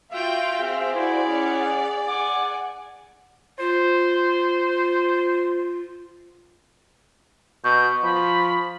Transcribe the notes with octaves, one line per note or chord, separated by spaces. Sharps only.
F4 F#4 E5 F5 G5
C4 G#4
E4 F#4 C5 D5
C#4 F#5
F#5 G#5 D6
F4 C5
B2 C#6 G6
F3 B5